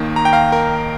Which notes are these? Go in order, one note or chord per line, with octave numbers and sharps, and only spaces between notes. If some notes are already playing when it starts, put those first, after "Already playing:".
Already playing: D#2 D#3 A#3
A#5
G5
F5 A#5
A#4